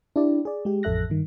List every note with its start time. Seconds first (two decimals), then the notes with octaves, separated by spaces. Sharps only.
0.16 D4 E4 G4 D5
0.45 G#4 D5
0.65 G#3 G4
0.83 A1 F2 A4 E5 F#6 A#6
1.10 G2 D#3